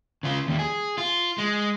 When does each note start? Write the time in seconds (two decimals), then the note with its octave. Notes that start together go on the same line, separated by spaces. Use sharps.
0.23 C#3 F4
0.47 D#2 G3
0.59 G#4
0.98 F4
1.38 G#3